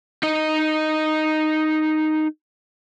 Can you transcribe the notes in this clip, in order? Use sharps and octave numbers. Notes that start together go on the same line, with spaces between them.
D#4 D#5